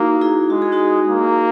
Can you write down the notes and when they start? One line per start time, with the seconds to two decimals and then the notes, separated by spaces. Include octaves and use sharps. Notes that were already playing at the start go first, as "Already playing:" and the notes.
Already playing: A#3 D#4 E4 F#4
0.21 E4 G#4
0.50 G#3 F#4
0.62 G#4
0.72 D#4 F#4
1.09 A#3